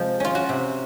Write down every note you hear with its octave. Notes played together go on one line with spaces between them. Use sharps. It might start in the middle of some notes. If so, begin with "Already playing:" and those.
Already playing: C3 F3 G#3
C#4 F4
F#4
C3